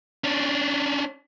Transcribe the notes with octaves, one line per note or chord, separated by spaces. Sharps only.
C#4 D4